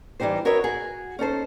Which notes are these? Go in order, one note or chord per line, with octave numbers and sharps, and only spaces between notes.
E3 G3 D#4 G4 C5
F#4 A#4 B4 C#5 D#5 E5
F#4 G#4
C#4 D#4 A4 C5